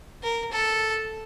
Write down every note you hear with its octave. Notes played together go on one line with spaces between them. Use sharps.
A#4
A4